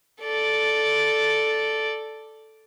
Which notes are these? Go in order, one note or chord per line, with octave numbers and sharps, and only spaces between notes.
A4 D5